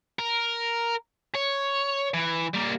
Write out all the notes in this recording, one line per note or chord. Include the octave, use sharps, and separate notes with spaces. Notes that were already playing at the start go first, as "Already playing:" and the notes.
A#4
C#5
E3
G3 A#3